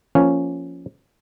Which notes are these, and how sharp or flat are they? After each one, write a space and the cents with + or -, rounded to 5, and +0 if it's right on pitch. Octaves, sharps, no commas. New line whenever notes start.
F3 +0 A#3 +0 C#4 +0